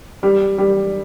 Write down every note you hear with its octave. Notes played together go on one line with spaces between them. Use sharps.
G3
G3